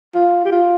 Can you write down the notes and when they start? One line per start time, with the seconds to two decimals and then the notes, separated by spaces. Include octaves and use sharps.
0.15 F4
0.45 G4
0.52 F4